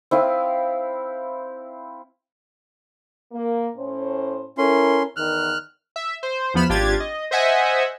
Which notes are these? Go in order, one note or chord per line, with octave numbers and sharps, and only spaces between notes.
C4 E4 F5 D#6
A#3
A2 C#4 C5
C#4 E4 A4 A#4 C6
E2 D#3 F6 F#6
E5
C5
E2 F3 B3 B5 F6 E7
G#1 D4 F4 G4 G#6 A6
D#5
C5 D#5 E5 F#5 G#5